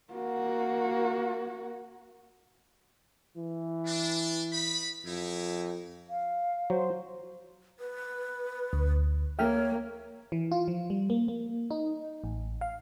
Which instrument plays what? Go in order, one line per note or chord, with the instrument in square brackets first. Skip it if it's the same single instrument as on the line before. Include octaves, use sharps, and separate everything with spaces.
[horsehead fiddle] A#3 F#4
[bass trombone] E3
[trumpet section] D4
D#4 B5
[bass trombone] F2 [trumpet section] D#4 E4
[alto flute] F5
[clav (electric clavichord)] F#3 [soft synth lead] C5
[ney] B4
[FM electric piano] D2
[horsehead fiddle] A#3 [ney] C#5 [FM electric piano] E5 G5 F6
[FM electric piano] E3
F4
F3
G3
A#3
A#3
D#4
A1
F5